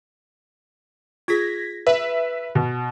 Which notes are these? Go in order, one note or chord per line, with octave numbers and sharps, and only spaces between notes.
F4 G#4 G#6 A#6 B6
B4 E5
B2